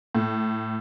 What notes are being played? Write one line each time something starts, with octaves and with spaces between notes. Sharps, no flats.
A2